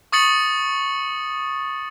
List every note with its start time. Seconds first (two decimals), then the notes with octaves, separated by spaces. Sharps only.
0.12 C#6 D#6 A6 C#7 F#7